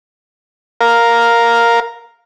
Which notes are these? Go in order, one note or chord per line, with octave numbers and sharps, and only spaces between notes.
A#4 F5